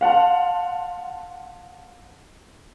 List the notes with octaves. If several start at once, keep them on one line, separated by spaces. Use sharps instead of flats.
F5 F#5 A5 C6